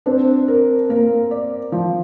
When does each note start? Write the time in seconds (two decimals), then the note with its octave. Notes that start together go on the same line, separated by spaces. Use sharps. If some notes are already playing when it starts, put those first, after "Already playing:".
0.06 C4 D4
0.48 A#4
0.89 A#3 A#4
1.31 D5
1.72 F3